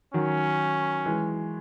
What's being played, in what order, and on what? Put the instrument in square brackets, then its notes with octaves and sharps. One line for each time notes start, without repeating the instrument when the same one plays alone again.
[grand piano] D#3 F#3 [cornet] C#4
[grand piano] E3 G#3